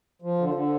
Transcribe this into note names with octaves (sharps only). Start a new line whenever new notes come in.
F3
D3
D3